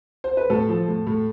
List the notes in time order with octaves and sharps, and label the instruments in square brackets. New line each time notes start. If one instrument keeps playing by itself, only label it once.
[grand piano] C5
B4
A2 A4
F3
A2
A2